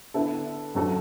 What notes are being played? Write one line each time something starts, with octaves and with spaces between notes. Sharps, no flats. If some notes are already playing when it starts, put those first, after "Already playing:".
D3 B3 E4 A4
F#2 F#3 D4 F#4 A4